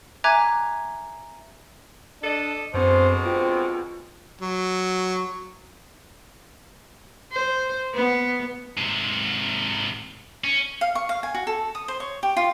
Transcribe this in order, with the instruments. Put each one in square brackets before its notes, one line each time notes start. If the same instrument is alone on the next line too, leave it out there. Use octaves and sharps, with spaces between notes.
[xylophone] E5 G#5 A#5 D6 F#6 G#6
[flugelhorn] D4 [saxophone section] A4 D#5
[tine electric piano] F#2 C4 [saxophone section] B2 D3 G#3 [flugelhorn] C5
[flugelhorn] C4 [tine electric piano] F4
[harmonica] F#3
[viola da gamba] C5
B3
[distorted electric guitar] G#2 C3
C#4
[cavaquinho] F5
C#6
F5
G#5
F#4
A4
D#6
C5
C#5
G4
F4